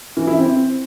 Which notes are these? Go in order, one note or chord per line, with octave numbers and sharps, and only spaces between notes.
E3
E4
C4